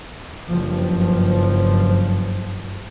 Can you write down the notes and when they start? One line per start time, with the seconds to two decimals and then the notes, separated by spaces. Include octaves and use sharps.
0.49 F#1 G2 F3